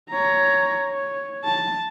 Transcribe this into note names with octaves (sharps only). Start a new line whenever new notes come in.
C#5 A#5
C#5
A5